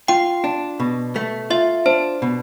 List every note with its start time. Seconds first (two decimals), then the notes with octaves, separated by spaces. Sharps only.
0.08 F4 G5
0.44 D4
0.80 B2
1.16 A3
1.50 F4 E5
1.86 D4 C5
2.22 B2